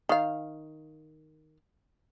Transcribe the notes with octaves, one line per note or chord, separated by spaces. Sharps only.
D#3 F5